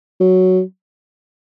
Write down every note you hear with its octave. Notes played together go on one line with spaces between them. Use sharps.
F#3